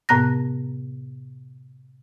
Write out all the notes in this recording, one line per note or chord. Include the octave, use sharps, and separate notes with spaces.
A2 C3 B3 A#5 F#6 A#6